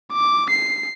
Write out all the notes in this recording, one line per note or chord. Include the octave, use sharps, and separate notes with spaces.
D6
C7